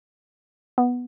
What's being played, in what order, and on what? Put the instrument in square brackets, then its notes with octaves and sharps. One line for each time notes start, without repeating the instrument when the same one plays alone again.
[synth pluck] B3